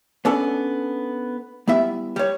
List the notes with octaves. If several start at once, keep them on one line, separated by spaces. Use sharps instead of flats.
B3 C#4 D4 A4 D5
G3 B3 E4 E5
G3 C#5